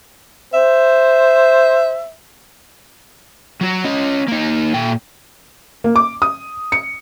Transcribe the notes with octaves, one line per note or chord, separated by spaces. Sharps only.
C5 E5
F#3 F#4
C#4 D#5
A#3 D#4
A#2 G5
A#3
D6
D#6
C#7